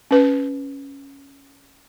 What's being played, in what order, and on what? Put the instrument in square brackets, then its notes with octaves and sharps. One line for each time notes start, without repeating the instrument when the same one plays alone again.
[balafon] C#4 B4